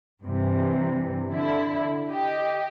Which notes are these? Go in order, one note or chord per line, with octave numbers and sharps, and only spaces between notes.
G2 C3 E3
D3 E4
G4 D#5